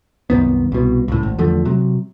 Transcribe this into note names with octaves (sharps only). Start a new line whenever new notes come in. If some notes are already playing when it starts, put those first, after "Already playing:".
C2 F#2 D#3 B3
C2 B2
C#2 A2
G#1
E2 D3 F3 A3
C3 F#3